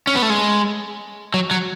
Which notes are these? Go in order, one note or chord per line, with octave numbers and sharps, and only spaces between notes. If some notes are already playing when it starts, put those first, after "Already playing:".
C#4
B3
A3
G#3
F#3
F#3